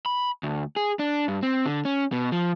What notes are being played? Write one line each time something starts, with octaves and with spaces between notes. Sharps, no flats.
B5
D2
G#4
D4
G2
C4
D3
C#4
B2
F3